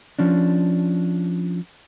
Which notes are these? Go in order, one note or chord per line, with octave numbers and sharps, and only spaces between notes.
F3 C#4 D4